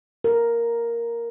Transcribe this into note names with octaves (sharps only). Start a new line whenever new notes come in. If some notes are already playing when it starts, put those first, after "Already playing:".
A#4